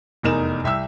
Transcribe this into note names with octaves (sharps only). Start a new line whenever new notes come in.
F1 E2 D#4 A#4 E7
C2 E5 G5 E6